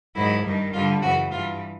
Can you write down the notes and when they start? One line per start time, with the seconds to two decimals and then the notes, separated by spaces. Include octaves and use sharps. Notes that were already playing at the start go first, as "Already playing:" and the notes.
0.14 G#2 D#3 F#3 E4
0.43 G2 D#3 G3
0.73 G2 D3 G3 F4
1.02 F#2 C#3 E3 F#4
1.31 G2 E3 G3 F4